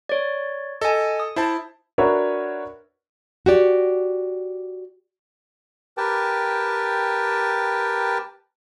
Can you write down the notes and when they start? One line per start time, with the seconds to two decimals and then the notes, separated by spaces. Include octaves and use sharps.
0.09 C#5 D5
0.81 A4 D#5 G#5
1.20 D#6
1.36 E4 C5 A5
1.98 D4 F#4 A#4 B4 C#5 E5
3.46 F#4 G4 D5
5.97 G4 A#4 B4 G5 A5